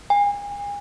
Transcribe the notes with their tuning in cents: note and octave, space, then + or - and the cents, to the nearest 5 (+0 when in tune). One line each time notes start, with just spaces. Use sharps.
G#5 -35